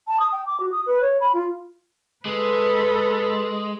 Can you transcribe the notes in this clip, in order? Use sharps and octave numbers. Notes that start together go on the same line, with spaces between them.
A5
D#6
G5
D6
F#4
D#6
B4
C#5
B5
F4
G#3 A4 B4